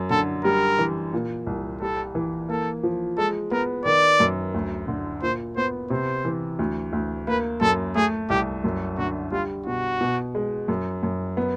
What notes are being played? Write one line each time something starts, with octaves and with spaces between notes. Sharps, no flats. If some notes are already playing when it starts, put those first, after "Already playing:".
Already playing: F#2
D3 A4
G3 A#4
E3
A#2
C2
G3 A4
E3
A#3 A4
F3
G#3 A4
B3 A#4
D#3 D5
F#2
D2
D3
A#2 C5
B3 C5
C3 C5
E3
D2
D2
A#3 B4
F#2 A4
A3 G#4
C2 G4
F#2
D3 F#4
G3 F4
B2 F#4
B2
G#3
F#2
F#2
B3